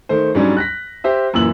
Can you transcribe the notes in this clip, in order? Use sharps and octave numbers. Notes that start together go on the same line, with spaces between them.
D#3 A3 C5
G#2 F#3 G3 C#4 D4
F#6 A#6 B6
G4 C5 E5
F#2 A#2 E3 E6 F#7